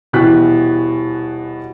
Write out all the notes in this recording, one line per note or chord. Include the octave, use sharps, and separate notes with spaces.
D#1 B2 E3 F#6 B6